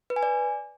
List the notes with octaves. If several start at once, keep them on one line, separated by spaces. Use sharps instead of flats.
B4
G#5
D5